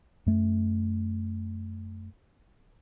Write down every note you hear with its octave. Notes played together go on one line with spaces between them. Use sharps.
F#2 A3